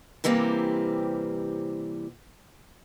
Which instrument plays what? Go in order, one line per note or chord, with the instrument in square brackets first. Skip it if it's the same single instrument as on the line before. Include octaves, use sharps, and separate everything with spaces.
[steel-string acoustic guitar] C3 E3 G3 A#3 C4